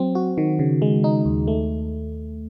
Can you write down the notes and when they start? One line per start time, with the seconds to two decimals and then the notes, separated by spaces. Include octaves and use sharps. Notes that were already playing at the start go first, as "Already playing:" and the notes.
Already playing: F#3 C4
0.15 F#4
0.38 D#3
0.59 C#3
0.82 G#3
1.04 D#4
1.25 D#2
1.48 A3